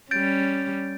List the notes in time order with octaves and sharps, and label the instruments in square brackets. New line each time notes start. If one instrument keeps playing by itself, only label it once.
[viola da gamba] G3 C#4 [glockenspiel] G6 A6 D7